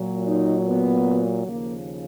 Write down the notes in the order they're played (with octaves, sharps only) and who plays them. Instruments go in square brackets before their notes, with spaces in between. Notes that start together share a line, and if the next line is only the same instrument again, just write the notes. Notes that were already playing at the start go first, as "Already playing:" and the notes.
Already playing: [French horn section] A#2 F#3
D#4
B3
D#2 C#3 F3 A#3